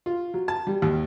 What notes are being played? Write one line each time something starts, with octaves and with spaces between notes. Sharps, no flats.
F4
F#3
A5
G3
D#2